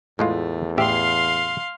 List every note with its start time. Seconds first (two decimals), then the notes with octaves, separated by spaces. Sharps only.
0.19 E2 A2 G#3 A3 F4
0.78 A1 G4 E5 F5 C6